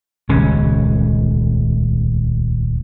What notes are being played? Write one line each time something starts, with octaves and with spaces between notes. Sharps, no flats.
D#1 C#2 C#4